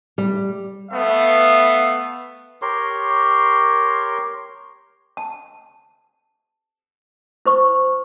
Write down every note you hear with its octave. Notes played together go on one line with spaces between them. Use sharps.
G3
A3 B3 E5 F5
G4 A#4 C#5 C6
A5
E4 C5 C#6